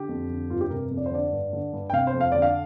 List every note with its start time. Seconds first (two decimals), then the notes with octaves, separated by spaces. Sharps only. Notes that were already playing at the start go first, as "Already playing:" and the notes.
Already playing: D3 G4
0.09 F2
0.30 D3
0.50 G2 F4
0.61 G4
0.70 C3 A#4
0.91 F2
0.97 D5
1.06 C5
1.11 D3 D5
1.32 G2
1.53 D3
1.73 G2
1.90 G5
1.93 C3 F5
2.07 C5
2.14 F2
2.21 F5
2.32 D3 D5
2.42 F5